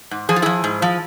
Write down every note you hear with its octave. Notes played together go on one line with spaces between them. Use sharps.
G#2
F3 G#4
F4
F3 E4 G#4
G#2
F3